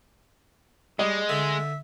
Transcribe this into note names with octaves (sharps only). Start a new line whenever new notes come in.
G3 G#3 D#5
D3 E5